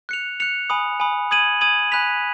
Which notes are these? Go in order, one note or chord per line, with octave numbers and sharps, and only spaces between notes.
F#6 C#7 F7
F#6 C#7 F7
G#5 B5 D#6
G#5 B5 D#6
D#6 G#6 D#7 F#7
D#6 G#6 D#7 F#7
G#5 B5 F#6 B6 F7